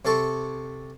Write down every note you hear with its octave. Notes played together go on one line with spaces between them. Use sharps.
C3 A4 C#6